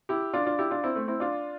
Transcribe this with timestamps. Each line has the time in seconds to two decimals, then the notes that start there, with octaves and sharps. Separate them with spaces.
0.09 E4 G4
0.34 D4 F4
0.46 D4 F4
0.59 E4 G4
0.71 D4 F4
0.83 C4 E4
0.95 A3 C4
1.08 C4 E4
1.20 D4 F4